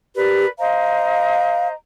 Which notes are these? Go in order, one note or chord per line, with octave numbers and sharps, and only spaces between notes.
G4 A#4 B4 D5
C5 D#5 F5 A#5